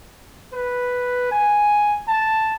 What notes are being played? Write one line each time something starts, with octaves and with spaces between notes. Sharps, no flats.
B4
G#5
A5